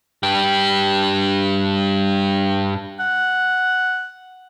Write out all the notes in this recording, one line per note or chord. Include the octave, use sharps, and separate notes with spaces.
G2 G4
F#5